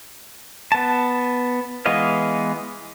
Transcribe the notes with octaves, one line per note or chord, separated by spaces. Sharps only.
B3 A5
E3 G#3 B3 D#5 F5